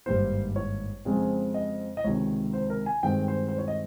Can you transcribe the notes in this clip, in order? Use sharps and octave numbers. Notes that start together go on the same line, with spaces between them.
G#1 G2 G3 A#3 C5
C#5
F2 C#3 G#3 C4
D#5
D#5
C#2 C3 D#3 C#5
C5
A#4
G#5
G2 D#3 G#3 C4 G5
C5
C5
C#5
D#5